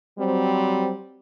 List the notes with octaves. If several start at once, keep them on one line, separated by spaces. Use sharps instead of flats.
F#3 G3 C4